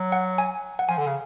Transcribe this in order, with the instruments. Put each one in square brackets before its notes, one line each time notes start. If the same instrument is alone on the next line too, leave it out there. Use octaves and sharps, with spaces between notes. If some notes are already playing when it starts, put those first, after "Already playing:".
Already playing: [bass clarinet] F#3
[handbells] F#5
G#5
F#5
[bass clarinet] F3 [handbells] G#5
[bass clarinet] D3
C#3